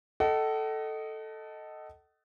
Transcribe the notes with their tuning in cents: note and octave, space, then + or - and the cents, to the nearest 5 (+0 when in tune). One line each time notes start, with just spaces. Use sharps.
A4 +0 D#5 +0 F#5 +40